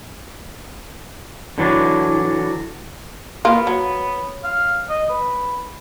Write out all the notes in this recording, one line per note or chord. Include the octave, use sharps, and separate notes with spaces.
D3 E3 F#3 D4
A#3 B3 F4
F#3
F5
D#5
B4